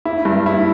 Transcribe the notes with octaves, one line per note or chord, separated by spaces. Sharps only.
E4
G2
E4